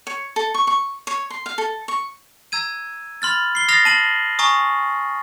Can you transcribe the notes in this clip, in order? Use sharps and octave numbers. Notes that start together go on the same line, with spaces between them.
C#5
A4
C#6
C#6
C#5
C6
F5
A4
C#6
A#5 E6 G#6 D#7
B5 C6 F6 A6
C7 G7
D#6 F6 A6 A#6 C7 F7
A5 D#7 F#7
G#5 A#5 C#6 D#6